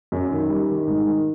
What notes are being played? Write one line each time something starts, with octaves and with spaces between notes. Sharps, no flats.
F#2
D#3
G3
D#3
G#2
D#3